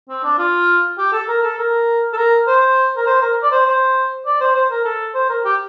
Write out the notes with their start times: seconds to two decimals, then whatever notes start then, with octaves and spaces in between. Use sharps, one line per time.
0.09 C4
0.24 D4
0.38 F4
0.98 G4
1.12 A4
1.28 A#4
1.43 A4
1.58 A#4
2.13 A4
2.17 A#4
2.47 C5
2.96 A#4
3.06 C5
3.22 A#4
3.43 D5
3.51 C5
3.66 C5
4.26 D5
4.40 C5
4.55 C5
4.71 A#4
4.85 A4
5.14 C5
5.29 A#4
5.45 G4